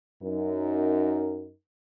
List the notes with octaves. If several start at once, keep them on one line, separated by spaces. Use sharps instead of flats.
F#2 D#4 A#4